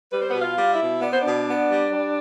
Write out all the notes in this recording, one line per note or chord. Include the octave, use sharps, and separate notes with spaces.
G3 B4
C5
B2 B3 B4
F4 F5
G3
E4 E5
B2
B3 D5
C5
B2 D4 D5
B3
G3
G3